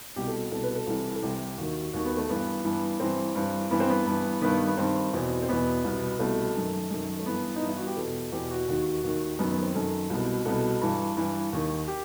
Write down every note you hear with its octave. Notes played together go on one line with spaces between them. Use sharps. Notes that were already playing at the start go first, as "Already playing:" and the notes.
C2 B2 G4
A4
C2 B2 A4
B4
A4
C2 C3 E3
A4
C2 C3 E3 G4
D#2 D#3 F#4
D#2 D#3 F#4
B3
A3
G2 E3 B3
G2 E3
G2 E3 C4
G2 E3
G2 E3 B3
C4
B3
G2 E3
G2 D#3 B3
B3
G2 D#3 C4
E2 B2
C4
E2 B2 B3
C2 B2
C2 B2 A3
F#2 D#3
F#2 D#3
A3
G2 E3 B3
D#4
G2 E3 E4
F#4
G4
E2 B2 A4
E2 B2 G4
F#4
D#2 D#3 F#4
D#2 D#3
F#2 D#3 B3
B3
C4
F#2 D#3 A4
C2 B2
C2 B2 A4
G2 E3
G2 E3
D#2 D#3
G4